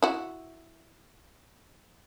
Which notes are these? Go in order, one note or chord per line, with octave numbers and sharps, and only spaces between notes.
E4 F#4